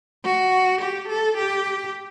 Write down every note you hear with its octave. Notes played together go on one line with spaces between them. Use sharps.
F#4
G4
A4
G4